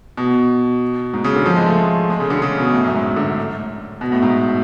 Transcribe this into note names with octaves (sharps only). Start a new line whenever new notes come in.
B2
G#2
C#3
D3
F3
G#3
A3
G#3
C#3
D3
C#3
B2
A2
F#2
G#2
D3
B2
A2
G#2